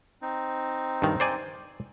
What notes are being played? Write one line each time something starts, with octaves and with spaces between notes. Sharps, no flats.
C4 D#4
G2 D#3
C5 D5 G#5